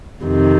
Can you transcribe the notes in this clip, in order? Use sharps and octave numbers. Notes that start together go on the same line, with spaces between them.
F2 C3 D#3